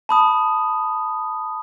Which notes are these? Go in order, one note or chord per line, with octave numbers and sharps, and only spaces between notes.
A5 B5 D#6